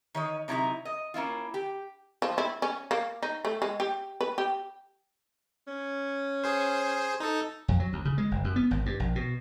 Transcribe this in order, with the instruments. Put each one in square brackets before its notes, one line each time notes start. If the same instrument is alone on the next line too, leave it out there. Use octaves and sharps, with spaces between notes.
[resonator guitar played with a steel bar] D#3 C#5 D#5
C3 F#3 D#4 E4 C5 A#5
D#5
A#3 C#4 E4 F4
G4
[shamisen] F3
E4
C#4
A#3
D#4
A3
G#3
G4
B4
G4
[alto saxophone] C#4
[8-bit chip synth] G#4 C5
D#4 A4
[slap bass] F2
F#3
D2
C#3
G#3
F#1
F#2
B3
G#1
G2
A#1
B2